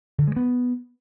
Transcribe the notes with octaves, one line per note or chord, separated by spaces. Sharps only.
D3
G#3
B3